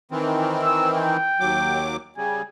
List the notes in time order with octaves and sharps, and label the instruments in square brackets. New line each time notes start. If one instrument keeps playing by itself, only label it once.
[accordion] D#3 E3 C4
[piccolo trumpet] E6
G5
[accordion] D#2 F#3 D6
[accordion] C#3 G3 [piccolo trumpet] G#5